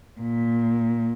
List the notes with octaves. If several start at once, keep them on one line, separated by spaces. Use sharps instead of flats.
A#2